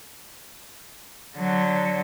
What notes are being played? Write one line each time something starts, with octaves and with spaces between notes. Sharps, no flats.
D3 F#3